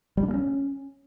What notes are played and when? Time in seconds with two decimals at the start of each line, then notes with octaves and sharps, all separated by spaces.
0.17 G3
0.23 D4
0.28 A#3
0.34 C#4